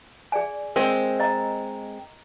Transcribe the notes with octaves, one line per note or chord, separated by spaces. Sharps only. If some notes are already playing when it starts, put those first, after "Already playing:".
G#4 D5 G#5
G#3 C4 A#4
D#5 A#5